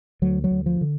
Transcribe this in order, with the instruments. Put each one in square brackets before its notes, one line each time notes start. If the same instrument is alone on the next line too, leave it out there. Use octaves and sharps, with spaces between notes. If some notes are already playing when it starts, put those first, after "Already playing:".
[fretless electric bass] D2 F#3
F#3
D2
F3
D3